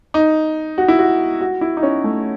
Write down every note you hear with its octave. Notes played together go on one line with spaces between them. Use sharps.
D#4
F#4
E4
F#4
F#4
E4
D#4
C#4
A3